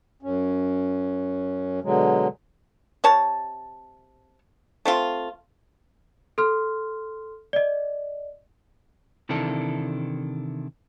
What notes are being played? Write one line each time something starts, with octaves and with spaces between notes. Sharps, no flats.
F#2 C#4
B2 D3 F#3 G#3
C3 C#5 A5
A3 C4 F4
A4 C6 F6
D5 D#5
C3 D#3 E3 D4 E4 A4